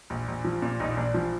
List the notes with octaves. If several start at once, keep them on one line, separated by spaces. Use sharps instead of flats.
A#1
A#1
F3
A#2
A#1 D#4
A#1 D4
F3